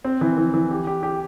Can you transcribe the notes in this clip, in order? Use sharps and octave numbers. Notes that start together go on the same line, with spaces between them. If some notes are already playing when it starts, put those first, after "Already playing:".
C4
E3
E3
E3
G4
G4
G4